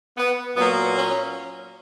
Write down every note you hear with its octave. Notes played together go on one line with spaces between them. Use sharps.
B3
A#2 F#3 A#3 B3
C#4